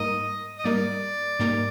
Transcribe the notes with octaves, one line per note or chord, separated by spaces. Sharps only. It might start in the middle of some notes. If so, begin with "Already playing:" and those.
Already playing: G#2 G3 A#3 D#4 A#4 D#5
D#5
G#2 G3 A#3 D#4 A#4 D5
G#2 G3 A#3 D#4 A#4